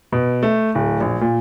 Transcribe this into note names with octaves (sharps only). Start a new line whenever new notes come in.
B2
A3
D1
A#1
A#2